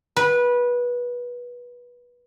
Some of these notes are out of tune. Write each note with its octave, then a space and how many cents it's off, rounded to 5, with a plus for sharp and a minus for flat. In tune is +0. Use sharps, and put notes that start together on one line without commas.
B4 -20